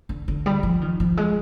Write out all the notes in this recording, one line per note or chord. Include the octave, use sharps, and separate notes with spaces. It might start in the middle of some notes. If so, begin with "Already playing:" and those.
D3
D3
G3
F3
D#3
F3
G#3